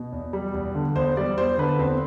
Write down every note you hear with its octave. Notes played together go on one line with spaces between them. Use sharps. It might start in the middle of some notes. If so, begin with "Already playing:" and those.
Already playing: B2
E2
G3
E2
D3
E2 C5
G3 D5
E2 C5
D3 B4
E2 C4